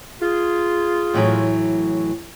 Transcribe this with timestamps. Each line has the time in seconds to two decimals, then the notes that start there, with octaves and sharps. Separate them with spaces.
0.22 F4 G#4
1.14 A2 E3 F#3